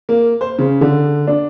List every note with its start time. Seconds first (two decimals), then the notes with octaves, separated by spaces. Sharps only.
0.09 A#3
0.41 C5
0.59 C#3
0.81 D3
1.27 D4